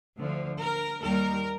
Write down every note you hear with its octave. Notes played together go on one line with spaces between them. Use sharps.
D2 D3 F3
A#4
D#2 D#3 G3 A#4